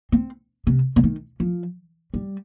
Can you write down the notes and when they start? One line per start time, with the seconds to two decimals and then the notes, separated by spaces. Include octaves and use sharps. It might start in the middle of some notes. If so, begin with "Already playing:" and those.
0.12 C4
0.67 C3
0.96 C3
1.04 D#3
1.40 F3
2.14 G3